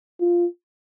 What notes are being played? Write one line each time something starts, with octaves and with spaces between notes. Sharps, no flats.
F4